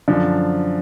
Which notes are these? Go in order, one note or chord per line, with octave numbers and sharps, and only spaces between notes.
F#2 D3 F3